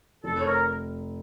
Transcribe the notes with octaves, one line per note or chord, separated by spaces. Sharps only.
F1 A4
C#5
A#4